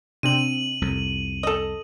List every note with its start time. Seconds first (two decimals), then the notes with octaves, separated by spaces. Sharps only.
0.23 C3 C4 D4 D#7 F#7
0.82 C2 F2
1.43 A4 D#5